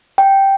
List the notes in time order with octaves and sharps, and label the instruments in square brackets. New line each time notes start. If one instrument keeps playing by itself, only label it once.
[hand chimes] G5